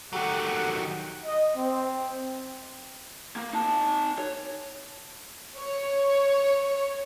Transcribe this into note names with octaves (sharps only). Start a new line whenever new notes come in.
D#3 F#3 G4 A4 F#5
D#5
C4
A#3
D#4 A5
C#5
C#5